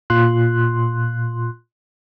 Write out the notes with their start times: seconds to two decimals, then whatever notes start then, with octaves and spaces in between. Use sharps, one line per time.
0.10 A#2 F4 C6 F#6